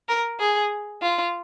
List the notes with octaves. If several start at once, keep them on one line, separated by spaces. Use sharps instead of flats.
A#4
G#4
F4